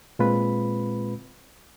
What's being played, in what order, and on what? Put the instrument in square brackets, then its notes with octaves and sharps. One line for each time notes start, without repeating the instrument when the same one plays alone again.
[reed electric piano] A#2 G#3 C4 F4 B4 B5